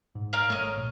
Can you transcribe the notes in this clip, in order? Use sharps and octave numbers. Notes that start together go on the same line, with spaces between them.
G#2
A#4 D5 F5
G#1 A3 C#5 D#5
A#1